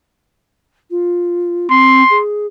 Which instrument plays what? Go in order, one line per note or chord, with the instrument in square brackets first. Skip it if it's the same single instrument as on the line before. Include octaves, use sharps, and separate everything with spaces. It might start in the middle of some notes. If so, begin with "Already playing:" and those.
[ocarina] F4
[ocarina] C4 [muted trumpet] C6
[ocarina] G#4